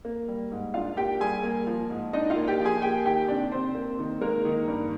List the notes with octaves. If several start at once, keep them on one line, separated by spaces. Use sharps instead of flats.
A#3
G3
G#2
D4 F4 F5
A#3 G4 G5
G3 G#4 G#5
A#3
F3
G#2
D4 D#4 D#5
F4 F5
A#3
G4 G5
F3
G#4 G#5
A#3 G4 G5
D#3 G4 G5
C3 D4 D5
C3 C4 C5
A#3
D#3
G#3 A#3 A#4
D#3
G2